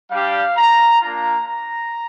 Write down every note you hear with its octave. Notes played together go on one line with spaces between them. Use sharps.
G3 D4 G4 F5
A#5
A#3 D4 F4 A#5
A#5